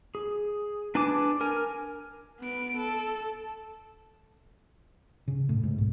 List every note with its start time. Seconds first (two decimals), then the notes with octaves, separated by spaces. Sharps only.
0.15 G#4
0.95 D4 B4 G#5 A5 D6
1.41 A#4 G#5
2.40 B3 D7
2.77 A4
5.28 C#3
5.49 A2
5.63 G#2
5.78 B1